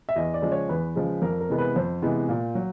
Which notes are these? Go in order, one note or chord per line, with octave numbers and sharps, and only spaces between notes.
E5
E2 D#5
D5
C#3 F3 G#3
C#5
E2 B4
C#3 F3 G#3
F2 A#4
A#4
C3 E3 G#3 B3
B4
F2 C5
C3 E3 G#3 B3
A#2
F#3